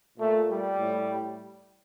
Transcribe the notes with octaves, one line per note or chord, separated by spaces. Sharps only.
A#2 A3
G3
A2